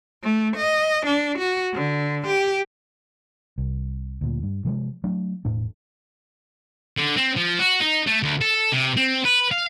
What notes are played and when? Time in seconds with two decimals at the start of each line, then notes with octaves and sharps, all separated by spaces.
0.23 A3
0.57 D#5
1.06 D4
1.38 F#4
1.74 D3
2.27 G4
3.58 C2
4.21 D2 A#2
4.43 G2
4.65 C3 F3 F#3 G#3
5.04 F#3 A3 D4
5.45 E1 A2 D4
6.98 D3
7.18 C4
7.37 F3
7.59 F#4
7.81 D#4
8.07 A3
8.23 D2
8.41 A4
8.72 C3
8.97 C4
9.25 B4
9.51 F5